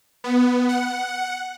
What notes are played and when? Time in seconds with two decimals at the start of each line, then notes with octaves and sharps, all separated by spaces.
0.24 B3
0.69 F#5